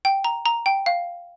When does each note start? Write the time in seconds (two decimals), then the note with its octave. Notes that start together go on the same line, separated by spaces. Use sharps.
0.05 G5
0.25 A#5
0.46 A#5
0.66 G5
0.86 F5